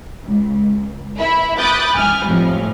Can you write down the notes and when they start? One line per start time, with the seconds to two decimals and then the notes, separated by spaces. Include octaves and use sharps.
0.23 C#2
1.19 E4 E5 B5
1.58 B5 D6 D#6 F#6 G6 A6
1.97 G#5 F6
2.26 F2 A2 F3 G3